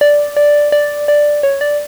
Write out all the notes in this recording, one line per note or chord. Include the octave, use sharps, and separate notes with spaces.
D5
D5
D5
D5
C#5
D5